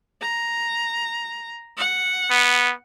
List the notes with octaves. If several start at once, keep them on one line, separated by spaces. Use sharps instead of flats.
A#5
F#5
B3